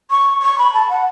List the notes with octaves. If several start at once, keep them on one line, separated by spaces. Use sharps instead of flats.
C#6
C#6
B5
A5
F#5